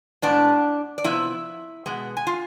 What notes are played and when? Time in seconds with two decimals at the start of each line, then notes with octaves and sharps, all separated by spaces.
0.22 A2 G#3 B3 D4 D5
0.98 D5
1.04 C3 F3 B3 E4 E5
1.86 B2 G#3 B3
2.17 G#5
2.27 F4 F5